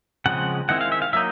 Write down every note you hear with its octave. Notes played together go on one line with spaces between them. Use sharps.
C#3 F3 G#3 C4 F#5
D#3 G#3 C4 E4 F#5
F5
E5
F5
F#3 A#3 D#4 E5